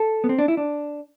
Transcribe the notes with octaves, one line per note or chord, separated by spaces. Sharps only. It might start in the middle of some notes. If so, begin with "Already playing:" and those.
Already playing: A4
B3
C4
D4
E4
D4